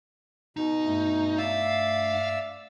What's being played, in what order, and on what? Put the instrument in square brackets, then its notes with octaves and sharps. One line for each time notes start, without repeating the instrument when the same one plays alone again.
[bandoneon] B2 [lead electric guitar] D#4
[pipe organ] G2 A3
[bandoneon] D5 E5 E6 [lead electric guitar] F5